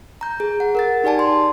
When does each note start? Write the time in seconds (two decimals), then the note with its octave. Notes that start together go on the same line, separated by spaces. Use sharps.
0.21 A#5 G6
0.40 G#4
0.60 F#5
0.75 A#4 F#5 A6
1.04 D#4 G4 D5 G#5 A5
1.19 C6